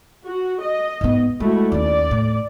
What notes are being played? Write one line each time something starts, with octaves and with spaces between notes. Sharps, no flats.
F#4
D#5
G#2 B3
G#3 A3 E4 F#4
D#2 C#4 D5
A2